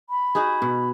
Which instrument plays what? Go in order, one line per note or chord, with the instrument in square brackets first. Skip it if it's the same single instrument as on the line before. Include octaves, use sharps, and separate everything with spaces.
[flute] B5
[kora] D#4 F#4 G#4
B2